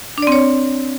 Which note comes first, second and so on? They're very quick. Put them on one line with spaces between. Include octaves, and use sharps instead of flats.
D4 D5 C4 C#5